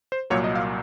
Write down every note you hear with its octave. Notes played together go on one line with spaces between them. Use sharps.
C5
C2 A#2 F#3 A#3 C#5
D#5
F5